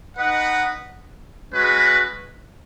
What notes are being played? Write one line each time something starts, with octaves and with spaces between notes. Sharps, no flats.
D#4 B4 D#5 F#5
G#3 C#4 F#4 B4